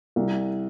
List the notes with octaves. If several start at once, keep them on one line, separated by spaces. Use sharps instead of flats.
C2